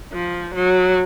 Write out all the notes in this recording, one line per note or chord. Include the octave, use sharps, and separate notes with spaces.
F3
F#3